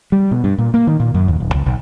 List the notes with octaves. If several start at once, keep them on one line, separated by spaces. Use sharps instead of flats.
G3
B2
G2
A#2
A#3
D#3
A#2
F#2
D#2
D#1
C#2
B1